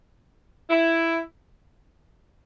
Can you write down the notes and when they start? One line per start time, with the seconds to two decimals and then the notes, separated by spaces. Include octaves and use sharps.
0.70 E4